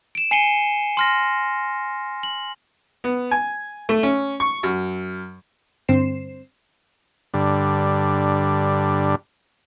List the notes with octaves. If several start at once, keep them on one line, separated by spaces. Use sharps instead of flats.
D7 E7
G#5 C7 C#7 D#7 G7
C6 F6 A#6
F#7
B3
G#5
A3
C#4
C#6
F#2
G2 D3 C4 C5 C7 E7
G2 D3